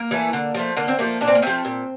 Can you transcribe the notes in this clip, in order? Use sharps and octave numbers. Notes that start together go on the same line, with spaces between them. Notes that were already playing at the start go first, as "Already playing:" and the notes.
Already playing: A#3
E3 A3
D3
F3 A3
D3 A#3
C4
F3 A3 A#3
A#2 D4
C4
A#3
F3 A3 C4
A#2